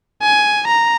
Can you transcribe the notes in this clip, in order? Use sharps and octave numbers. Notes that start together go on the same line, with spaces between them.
G#5
A#5